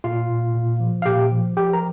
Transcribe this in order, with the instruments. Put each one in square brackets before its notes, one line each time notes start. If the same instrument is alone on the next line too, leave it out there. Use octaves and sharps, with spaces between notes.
[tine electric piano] A#2 F4 F5
A#2
A#2
F3
F5
A#2 G4 G5
F3
F3 G4 G5
A#4 A#5